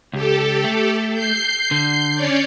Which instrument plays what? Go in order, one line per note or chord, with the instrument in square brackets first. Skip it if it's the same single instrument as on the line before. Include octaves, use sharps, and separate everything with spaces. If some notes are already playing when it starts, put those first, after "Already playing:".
[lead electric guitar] C#2 [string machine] G4 A4
[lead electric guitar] A3
[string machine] G6 C7
[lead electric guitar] D3
[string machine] C#4 C#5 D5